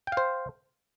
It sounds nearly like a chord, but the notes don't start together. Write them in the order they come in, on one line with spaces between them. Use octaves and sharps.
G5 F5 C5